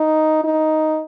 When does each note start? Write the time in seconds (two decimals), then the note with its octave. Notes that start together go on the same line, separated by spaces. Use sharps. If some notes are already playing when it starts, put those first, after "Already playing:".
Already playing: D#4
0.44 D#4